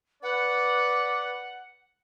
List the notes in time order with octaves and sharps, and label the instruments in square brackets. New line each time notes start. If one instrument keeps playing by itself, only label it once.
[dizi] B4 [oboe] D5 [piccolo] F#5